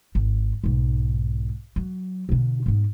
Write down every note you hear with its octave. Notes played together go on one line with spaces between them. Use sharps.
G#1
B1 G#2
F#3
B2 D3
G#2 B3